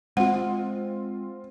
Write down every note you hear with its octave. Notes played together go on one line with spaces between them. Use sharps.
G#3 C4 F4 F#5